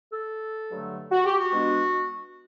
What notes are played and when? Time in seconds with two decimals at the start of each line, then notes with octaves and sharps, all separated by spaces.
0.10 A4
0.71 G2 D3 F#3 A3
1.12 F#4
1.25 G4
1.38 F#4
1.51 B2 G#3 B3 D4